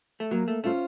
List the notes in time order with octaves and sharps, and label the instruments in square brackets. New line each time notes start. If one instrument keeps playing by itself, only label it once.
[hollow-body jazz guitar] A3
[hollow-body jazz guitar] F#3 [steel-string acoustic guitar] A#3
[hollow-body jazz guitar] A3
[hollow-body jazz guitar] A3 [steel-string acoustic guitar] C#4 F4 C5